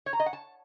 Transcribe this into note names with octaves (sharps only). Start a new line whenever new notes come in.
C#5
A#5
D#5
F#5
A5